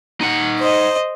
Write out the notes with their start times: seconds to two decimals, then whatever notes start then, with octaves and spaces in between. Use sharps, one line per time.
0.21 D#4 F#5
0.58 C5 D#5